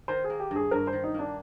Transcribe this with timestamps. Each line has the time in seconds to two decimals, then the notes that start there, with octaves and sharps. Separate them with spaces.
0.08 D#3 C5
0.24 G#4
0.30 A#3
0.40 G4
0.51 G2 G#4
0.71 G2 A#4
0.87 C5
0.93 D#3
1.04 D#4
1.14 A#3 D4